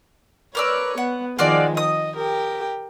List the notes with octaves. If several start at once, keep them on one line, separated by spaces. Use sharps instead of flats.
A#4 B4 C#5 D5 C#6 E6
B3 F#5
D#3 F3 G#3 F4 F#4 D5
D#5 D#6
G4 A#4 G5